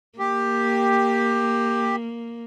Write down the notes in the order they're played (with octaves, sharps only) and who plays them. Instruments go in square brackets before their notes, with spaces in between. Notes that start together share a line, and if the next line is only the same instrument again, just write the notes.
[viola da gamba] A#3 [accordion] G4